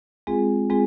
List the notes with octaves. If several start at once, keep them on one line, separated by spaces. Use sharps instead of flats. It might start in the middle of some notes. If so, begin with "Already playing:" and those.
G#3 C4 F4 G#4
G#3 C4 F4 G#4